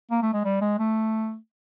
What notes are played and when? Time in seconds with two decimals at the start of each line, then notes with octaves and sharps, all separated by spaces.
0.11 A#3
0.22 A3
0.33 G#3
0.45 G3
0.62 G#3
0.79 A3